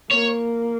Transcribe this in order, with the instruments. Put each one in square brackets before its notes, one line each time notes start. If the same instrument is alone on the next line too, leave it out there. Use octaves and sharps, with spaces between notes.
[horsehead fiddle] A#3 [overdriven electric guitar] C#5